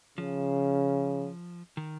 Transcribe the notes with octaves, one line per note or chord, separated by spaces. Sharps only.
C#3 F3
D#3